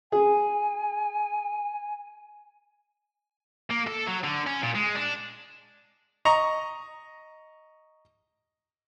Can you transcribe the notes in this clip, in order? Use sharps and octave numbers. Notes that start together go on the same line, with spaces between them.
G#4 G#5
A#3
A4
F#3
D3
C#4
A#2
G#3
D4
D#5 A#5 C#6